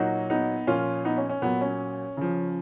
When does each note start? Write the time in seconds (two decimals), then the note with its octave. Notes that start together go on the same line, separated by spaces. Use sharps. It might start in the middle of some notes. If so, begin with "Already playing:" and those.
Already playing: A#2 F#3 D#4 F#4
0.30 B3 D#4
0.67 A#2 F3 C#4 F4
1.05 B3 D#4
1.17 C#4
1.29 C#4
1.42 A#2 F#3 B3
1.61 C#4
2.17 C#3 F3